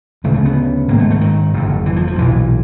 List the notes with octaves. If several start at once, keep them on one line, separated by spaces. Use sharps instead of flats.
D2 C#3 G#3
A3
B3
G#1 G#2 A#3
A3
A3
D#3
F#1 F2 D3
E3
F3
F3
B1 A#2 E3